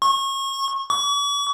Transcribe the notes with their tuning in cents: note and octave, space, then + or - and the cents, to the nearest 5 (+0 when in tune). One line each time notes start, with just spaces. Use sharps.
C#6 -30
C#6 +45